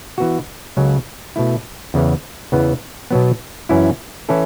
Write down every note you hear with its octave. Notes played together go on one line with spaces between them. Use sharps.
E3 B3 F#4
C#2 C#3 F#3 C#4 A4
B2 A3 E4
E2 C#3 E3
E2 C#3 E3 B3
B2 F#3 B3
F#2 E3 C#4 E4
E3 C#4 E4 A4